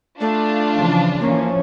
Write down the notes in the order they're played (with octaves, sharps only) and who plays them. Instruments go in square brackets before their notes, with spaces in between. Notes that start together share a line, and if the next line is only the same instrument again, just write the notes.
[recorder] A3 [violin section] D4 F4
[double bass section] C#3 E3 F3
[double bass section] E3 F3 C#4 [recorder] A#3